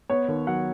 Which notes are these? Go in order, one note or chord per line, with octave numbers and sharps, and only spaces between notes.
B3 C#5
D#2
F#3 F#5